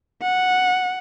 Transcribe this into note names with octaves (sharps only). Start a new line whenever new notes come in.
F#5